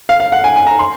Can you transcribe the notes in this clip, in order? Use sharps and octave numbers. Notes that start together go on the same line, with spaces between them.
F5
F5
F#5
G#5
G#5
A#5
C6